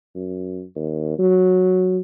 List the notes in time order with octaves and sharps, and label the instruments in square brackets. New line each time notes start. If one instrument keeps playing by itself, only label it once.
[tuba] F#2
D#2
F#3